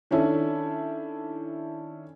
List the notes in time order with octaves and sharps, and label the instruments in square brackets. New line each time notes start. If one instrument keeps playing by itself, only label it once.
[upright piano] D#3 C#4 D4 E4 A4